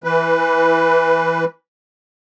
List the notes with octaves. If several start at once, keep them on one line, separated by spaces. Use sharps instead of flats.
E3 B4